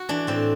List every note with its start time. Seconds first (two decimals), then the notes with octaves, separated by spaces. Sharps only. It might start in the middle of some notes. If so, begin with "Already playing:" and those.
Already playing: F#4
0.09 E3 D4
0.27 A2 C4